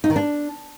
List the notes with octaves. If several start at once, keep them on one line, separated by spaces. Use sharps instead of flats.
D#4
D#3
D4